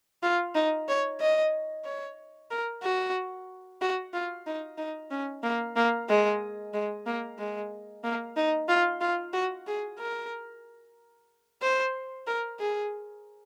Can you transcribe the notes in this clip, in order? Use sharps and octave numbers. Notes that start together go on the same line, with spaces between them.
F4
D#4
C#5
D#5
C#5
A#4
F#4
F#4
F4
D#4
D#4
C#4
A#3
A#3
G#3
G#3
A#3
G#3
A#3
D#4
F4
F4
F#4
G#4
A#4
C5
A#4
G#4